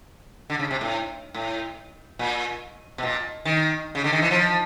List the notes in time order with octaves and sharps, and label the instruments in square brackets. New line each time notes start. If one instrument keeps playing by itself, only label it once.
[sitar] D3
C#3
C3
A2
A2
A#2
B2
A#2
D#3
C#3
D3
D#3
E3
F3